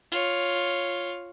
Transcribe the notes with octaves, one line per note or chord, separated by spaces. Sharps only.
F4 C#5